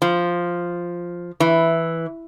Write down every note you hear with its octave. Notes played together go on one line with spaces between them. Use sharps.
F3
E3